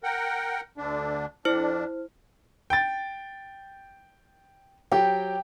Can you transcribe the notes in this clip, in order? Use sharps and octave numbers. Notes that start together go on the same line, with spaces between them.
A#4 F#5 G5
D2 D3 D4
F2 D4 E4 C5 F6
G5 A6
F#3 G4 G5